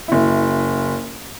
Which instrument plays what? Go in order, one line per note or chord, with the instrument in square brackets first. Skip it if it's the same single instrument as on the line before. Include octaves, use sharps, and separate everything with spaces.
[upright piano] F#1 E4